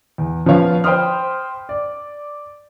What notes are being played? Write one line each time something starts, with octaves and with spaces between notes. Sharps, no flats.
E2
F3 B3 F4 C#5 F5
C5 G5 B5 C6 D#6 F6
D5